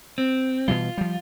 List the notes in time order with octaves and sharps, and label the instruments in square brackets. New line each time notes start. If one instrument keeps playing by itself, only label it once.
[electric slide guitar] C4
[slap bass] B2 E3 G3 [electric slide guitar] F4
[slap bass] F3 G3